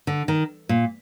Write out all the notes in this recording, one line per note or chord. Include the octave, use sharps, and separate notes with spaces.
D3
D#3
A#2